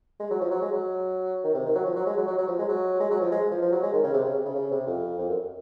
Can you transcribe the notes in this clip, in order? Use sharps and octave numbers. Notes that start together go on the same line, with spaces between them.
G#3
F#3
F3
F#3
G#3
F#3
D#3
C3
D#3
F#3
F3
F#3
G#3
F#3
F#3
F#3
F3
G#3
F#3
G#3
F#3
F3
G#3
F3
F3
F#3
G#3
D#3
C#3
C3
C#3
C3
C#3
C#3
C3
F2
F2
F#2